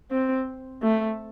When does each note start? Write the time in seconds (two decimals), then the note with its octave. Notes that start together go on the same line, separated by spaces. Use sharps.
0.11 C4
0.82 A3